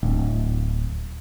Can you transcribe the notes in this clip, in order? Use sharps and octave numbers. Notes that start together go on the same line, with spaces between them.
D1